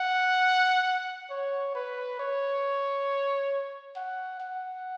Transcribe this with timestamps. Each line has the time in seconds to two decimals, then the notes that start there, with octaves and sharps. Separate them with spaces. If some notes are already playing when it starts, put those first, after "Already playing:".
Already playing: F#5
1.31 C#5
1.75 B4
2.20 C#5
3.96 F#5
4.40 F#5